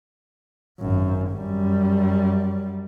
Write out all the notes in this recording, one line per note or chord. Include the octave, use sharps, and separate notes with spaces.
G#1 F#2
F#2 G3